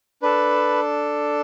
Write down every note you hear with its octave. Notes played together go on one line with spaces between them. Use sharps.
D4 A4 B4